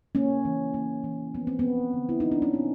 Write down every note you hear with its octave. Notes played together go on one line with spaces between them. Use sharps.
A#3 C#4
E3
A#3
E3
F3 B3
C4
B3
F3
D3
E4
F3 D#4
D4
C#4
A#2 C4